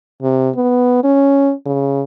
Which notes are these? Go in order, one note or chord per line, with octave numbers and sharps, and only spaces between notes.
C3
B3
C#4
C#3